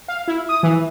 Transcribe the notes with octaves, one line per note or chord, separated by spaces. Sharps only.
F5
E4
D#6
E3